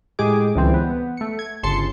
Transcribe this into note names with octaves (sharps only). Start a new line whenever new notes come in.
A2 G#3 G4 G#4 D6
C#2 D3 E3 G3 C4
B3
A3 C#7
G#6
G1 C#3 A5 C6 C#7